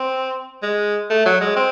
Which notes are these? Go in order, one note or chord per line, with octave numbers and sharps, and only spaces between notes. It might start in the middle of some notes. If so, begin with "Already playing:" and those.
Already playing: C4
G#3
A3
F#3
G#3
C4